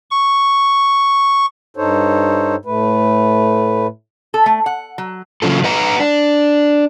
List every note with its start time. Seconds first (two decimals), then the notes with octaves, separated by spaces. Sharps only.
0.11 C#6
1.77 G2 D#4 A4 C5 C#5
2.65 A2 A3 B4
4.34 A4
4.46 A3
4.66 F#5
4.98 F#3
5.42 C#3 F#3 C#4 F4 A4
5.64 B4 D#5 F#5 A#5
6.00 D4